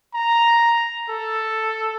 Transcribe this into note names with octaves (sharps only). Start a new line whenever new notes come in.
A#5
A4